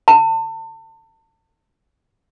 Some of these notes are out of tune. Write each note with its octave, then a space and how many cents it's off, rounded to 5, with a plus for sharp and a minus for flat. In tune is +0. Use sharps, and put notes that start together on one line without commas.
A5 +35